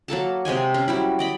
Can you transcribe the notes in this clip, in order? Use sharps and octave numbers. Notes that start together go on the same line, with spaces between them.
F#3 A#3 A4 A5
C3 G#3 D#5 G#5
C#4 C5
F#3 G3 E4
D5 D#5 B5